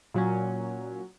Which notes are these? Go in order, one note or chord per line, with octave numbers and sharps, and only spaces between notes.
A#2 F#3 C#4